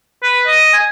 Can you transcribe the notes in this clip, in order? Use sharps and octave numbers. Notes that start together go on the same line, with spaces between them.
B4
D#5
G#5